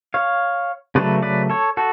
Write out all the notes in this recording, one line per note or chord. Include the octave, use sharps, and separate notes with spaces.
C#5 F5
C#3 F#3 A3 B4 D5
B4 D5
A4 C#5
F#4 A4